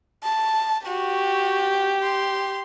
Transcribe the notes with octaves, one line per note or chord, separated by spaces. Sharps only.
A5
F#4 G4
C6